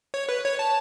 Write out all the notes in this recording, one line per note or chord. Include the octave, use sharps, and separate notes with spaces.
C#5
B4
C#5
A5